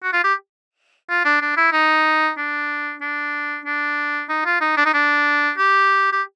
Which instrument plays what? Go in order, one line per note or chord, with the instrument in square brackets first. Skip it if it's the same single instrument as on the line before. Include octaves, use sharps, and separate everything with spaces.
[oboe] F#4
F4
G4
F4
D4
D4
E4
D#4
D4
D4
D4
D#4
F4
D#4
D4
D#4
D4
G4
G4